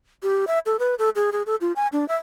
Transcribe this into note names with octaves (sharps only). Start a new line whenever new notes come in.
G4
E5
A4
B4
A4
G#4
G#4
A4
F4
G#5
D4
E5